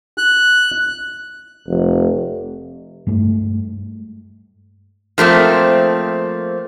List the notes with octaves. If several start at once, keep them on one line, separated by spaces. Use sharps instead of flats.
F#6
F1
G2 G#3 A3
F3 A3 A#3 C4